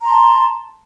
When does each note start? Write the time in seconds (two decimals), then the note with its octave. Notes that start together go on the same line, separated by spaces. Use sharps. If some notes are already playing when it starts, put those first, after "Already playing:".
0.01 A#5
0.05 C6
0.10 A5